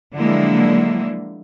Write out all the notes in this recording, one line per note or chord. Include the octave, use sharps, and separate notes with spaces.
D3 F3 F#3 G#3 A#3 E4